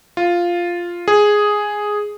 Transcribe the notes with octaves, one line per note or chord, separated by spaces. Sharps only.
F4
G#4